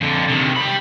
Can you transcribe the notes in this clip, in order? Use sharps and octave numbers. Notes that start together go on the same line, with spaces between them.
F2 D3
C3 D#3
G3 B5